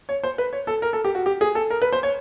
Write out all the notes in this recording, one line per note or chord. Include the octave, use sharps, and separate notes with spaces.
C#5
C5
B4
C#5
A4
A#4
A4
G4
F#4
G4
G#4
A4
A#4
B4
C5
C#5